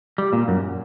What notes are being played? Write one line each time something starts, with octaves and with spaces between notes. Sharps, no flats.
G3
A#2
F#2